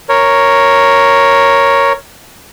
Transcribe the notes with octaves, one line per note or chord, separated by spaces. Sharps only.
A#4 C#5